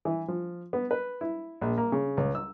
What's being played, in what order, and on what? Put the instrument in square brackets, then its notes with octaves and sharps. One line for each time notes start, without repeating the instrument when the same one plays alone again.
[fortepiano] E3
F3
B3
B4
E4
A#1
A#3
C#3
C#2
E6